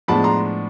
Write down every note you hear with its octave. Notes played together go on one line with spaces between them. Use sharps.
A2 F3 G#3 B3 D4 A5 B5
A#5 C6